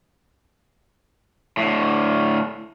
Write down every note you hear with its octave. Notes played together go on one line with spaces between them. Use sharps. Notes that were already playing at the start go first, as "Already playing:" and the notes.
A2 D3